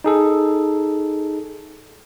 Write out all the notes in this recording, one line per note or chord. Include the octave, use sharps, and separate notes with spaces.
D#4 G#4 A4